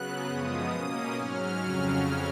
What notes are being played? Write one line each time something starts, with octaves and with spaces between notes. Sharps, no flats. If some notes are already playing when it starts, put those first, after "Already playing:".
Already playing: C#3 F#3 B3 F#6
F#2 C#3 F3 G#3 B3 D#6
B2 A#3 C#4 D#6
G#2 F#3 C#4 F6
F2 C#3 F#3 C#4